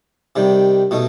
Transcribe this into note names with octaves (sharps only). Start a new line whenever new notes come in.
C3 D#3 G3
B2 A3 D#4